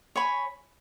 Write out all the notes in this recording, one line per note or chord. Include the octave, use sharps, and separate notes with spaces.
C#5 G#5 B5